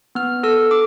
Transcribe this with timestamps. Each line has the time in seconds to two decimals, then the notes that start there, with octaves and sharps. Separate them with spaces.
0.15 B3 F6
0.43 A4 E6
0.71 D6